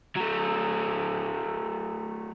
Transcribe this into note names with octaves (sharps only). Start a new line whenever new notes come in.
F#3 A3